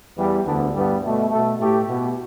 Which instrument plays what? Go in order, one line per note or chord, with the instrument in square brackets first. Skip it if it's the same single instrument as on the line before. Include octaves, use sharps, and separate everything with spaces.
[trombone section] E2 E3 G3
D2 D3 B3 D4
G2 G3 B3
B2 A3
B2 A3 A4
A2 A3 G4
B2 B3